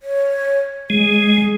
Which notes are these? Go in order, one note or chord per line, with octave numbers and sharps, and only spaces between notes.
C#5
G#3 G#4